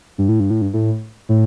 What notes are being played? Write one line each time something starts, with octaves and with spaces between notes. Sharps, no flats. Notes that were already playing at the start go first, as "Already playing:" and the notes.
G2
A2
G2
A2
G2
A2
A2